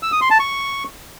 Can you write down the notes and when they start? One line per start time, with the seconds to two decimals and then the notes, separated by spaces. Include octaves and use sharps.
0.03 E6
0.12 D#6
0.21 C6
0.30 A5
0.40 C#6